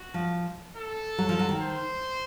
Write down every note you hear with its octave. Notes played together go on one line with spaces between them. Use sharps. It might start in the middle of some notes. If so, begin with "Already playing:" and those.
Already playing: F#4
F3
A4
F#3
F3
F#3
D#3
C5